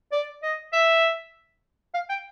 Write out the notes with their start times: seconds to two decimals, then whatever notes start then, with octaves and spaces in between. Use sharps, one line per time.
0.12 D5
0.42 D#5
0.73 E5
1.94 F5
2.09 G5